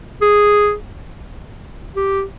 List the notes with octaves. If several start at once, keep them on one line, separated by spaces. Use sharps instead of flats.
G#4
G4